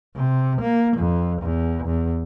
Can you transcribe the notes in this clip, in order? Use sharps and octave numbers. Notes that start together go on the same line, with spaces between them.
C3
A#3
F2
E2
E2